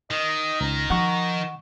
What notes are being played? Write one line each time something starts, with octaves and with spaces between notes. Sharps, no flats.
D#3 D#5
C#2 A#5
F3 F#5 C#6